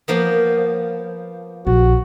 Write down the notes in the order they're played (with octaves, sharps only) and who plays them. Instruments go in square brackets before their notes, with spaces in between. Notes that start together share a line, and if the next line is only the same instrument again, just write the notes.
[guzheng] F3 A#3 B3
[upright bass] A#1 [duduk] F#4